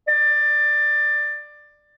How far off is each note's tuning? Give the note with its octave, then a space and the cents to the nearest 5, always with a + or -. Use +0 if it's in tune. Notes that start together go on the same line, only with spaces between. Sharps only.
D5 +15